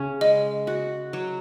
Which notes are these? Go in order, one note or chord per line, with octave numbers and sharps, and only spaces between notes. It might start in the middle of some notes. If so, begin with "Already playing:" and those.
Already playing: C#3 C#4
G#3 D#5
F#4
F#3